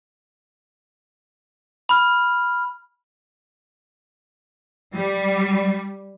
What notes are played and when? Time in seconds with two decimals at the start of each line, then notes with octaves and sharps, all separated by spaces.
1.89 B5 F6
4.94 G3